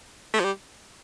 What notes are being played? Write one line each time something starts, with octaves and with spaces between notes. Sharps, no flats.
A3
F3
G3